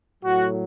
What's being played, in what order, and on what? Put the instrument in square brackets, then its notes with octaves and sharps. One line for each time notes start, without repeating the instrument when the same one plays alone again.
[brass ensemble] A2 F#3 F#4